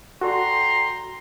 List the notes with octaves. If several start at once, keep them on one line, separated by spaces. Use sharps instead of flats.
F#4 A4 D5 G5 A#5 C6